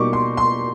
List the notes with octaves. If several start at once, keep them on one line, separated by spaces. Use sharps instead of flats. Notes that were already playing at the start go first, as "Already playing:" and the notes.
Already playing: B2 G3 A#3 D#4 C#6 D6
C6
C6